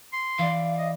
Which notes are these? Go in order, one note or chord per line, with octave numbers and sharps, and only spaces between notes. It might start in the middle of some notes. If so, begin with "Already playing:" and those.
C6
E3 D5 F5
D#5